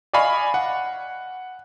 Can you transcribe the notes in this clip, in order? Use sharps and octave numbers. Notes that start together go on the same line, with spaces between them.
D5 D#5 F5 G#5 B5 C#6
F#5